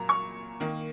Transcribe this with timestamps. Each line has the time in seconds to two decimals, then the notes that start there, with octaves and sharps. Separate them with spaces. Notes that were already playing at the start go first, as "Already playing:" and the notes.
Already playing: A#2 F#3 A#3 A#5
0.09 C#6
0.60 D#3 A#3